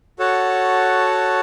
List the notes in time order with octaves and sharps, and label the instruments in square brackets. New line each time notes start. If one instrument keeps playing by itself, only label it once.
[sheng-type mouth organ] F#4 A4 C#5 F#5 A5